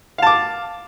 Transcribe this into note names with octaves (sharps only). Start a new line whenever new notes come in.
F5 A5 D6